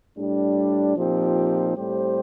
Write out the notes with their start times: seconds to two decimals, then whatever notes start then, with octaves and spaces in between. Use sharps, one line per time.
0.17 A2 G3 D4
0.97 A#2 F3 C4 D#4 G4
1.76 A2 G3 C4 G4 C5